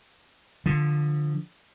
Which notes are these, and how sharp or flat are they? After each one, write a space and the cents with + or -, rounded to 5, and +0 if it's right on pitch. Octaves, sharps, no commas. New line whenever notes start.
D3 +15 F3 +10